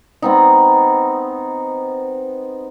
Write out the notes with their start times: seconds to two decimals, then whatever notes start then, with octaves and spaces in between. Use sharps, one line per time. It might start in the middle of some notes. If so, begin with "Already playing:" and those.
0.22 B3 C4 D#4